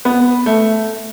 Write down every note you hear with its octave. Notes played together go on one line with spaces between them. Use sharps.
B3
A3